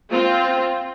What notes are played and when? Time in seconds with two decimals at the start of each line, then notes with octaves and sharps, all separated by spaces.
0.11 C4 F4